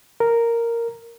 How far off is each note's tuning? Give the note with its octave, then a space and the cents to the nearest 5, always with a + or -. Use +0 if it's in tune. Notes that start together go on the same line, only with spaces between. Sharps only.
A#4 -5